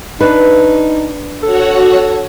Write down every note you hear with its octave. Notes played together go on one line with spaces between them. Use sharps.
D4 D#4 B4
F#4 A4 C#5 F#5